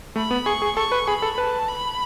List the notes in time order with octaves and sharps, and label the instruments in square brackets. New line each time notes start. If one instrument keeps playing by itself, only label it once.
[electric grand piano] A3 [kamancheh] B5
[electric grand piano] B3
[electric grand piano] G#4 [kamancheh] C#6
[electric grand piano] G#4
[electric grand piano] A4 [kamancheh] C#6
[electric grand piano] B4
[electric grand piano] G#4 [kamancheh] B5
[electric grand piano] A4
[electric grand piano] B4 [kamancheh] A5
[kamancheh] B5